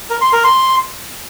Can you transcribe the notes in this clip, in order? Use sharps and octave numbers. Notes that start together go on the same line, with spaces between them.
A#4
C6
A#4
C6